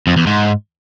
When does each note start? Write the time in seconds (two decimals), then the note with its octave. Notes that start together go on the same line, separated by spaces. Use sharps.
0.07 F2
0.17 E2
0.27 G#2